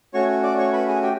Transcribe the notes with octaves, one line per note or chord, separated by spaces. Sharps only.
A3 C#4 F#4 C#5 C#6
D5 D6
C#5 C#6
B4 B5
G#4 G#5
G4 G5